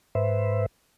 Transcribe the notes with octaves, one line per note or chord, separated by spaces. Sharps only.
G#2 B4 C5 E5